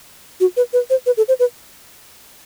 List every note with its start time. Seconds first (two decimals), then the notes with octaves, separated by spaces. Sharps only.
0.40 F#4
0.57 B4
0.73 B4
0.90 C5
1.06 B4
1.17 A4
1.28 C5
1.39 B4